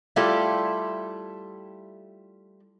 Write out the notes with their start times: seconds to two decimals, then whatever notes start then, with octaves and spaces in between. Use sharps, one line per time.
0.16 G3 A3 E4 F4 G4 A4